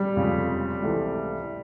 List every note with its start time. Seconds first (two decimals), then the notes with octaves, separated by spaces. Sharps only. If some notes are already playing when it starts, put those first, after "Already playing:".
Already playing: G3
0.16 F1 F2 C#3 F3 G#3
0.82 C#2 C3 E3 A3